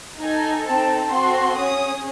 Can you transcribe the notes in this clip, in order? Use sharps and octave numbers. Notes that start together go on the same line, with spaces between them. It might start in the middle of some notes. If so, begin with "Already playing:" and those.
D#4 A4 G#5
C4 D#4 A4 A5
C4 F#4 A4 C6
C#4 G#4 D#6